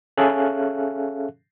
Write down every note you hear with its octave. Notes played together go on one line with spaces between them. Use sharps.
C#4 G#4 A4 E5 F5 F#6